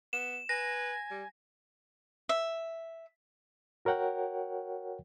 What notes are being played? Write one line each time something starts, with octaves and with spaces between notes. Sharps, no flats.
B3 E7
B4 G#5 A#6
G3
E5
F#4 A#4 C#5 F#5 G5